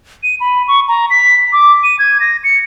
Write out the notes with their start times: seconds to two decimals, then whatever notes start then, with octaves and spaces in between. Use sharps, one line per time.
0.23 D#7
0.40 B5
0.68 C#6
0.88 A#5
1.10 B6
1.53 D6
1.84 D#7
1.99 G#6
2.20 A#6
2.44 C#7